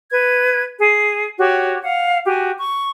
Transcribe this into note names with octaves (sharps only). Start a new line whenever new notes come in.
B4 G#6
G#4
F#4 G4 C#5
F5 F#5
F#4 G4 G#5
C#6